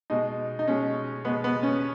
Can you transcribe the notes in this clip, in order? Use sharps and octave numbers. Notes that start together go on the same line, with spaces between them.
B2 G#3 D#4
D#4
B2 G#3 C#4
B2 G#3 B3
B3
C#4